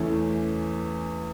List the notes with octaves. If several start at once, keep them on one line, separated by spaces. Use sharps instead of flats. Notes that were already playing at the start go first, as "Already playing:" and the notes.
Already playing: E2 E3 A3 C#4